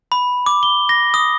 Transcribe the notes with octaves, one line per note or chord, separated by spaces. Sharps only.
B5
D6
G7
A#6
D#6